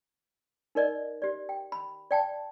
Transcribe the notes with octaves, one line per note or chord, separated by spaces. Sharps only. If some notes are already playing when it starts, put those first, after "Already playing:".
D#4 A#4 D5 D#5
G4 D5
G5
B5
D5 G5 A5